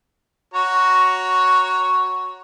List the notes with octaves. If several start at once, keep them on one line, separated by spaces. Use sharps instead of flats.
F#4 C#5 A#5